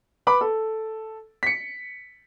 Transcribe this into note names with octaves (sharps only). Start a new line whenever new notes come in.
B4 B5 D6
A4
B6 C#7